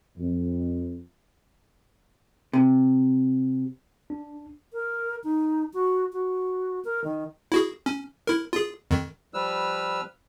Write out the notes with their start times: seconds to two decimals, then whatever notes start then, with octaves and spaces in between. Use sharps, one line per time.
0.17 F2
2.53 C3
4.10 D4
4.73 A#4
5.24 D#4
5.74 F#4
6.13 F#4
6.85 A#4
7.04 D#3
7.52 E4 F#4 G#4
7.86 C#4
8.27 E4 A#4
8.53 F4 G#4
8.91 F2 D#3
9.34 F3 G3 B4 E6 F6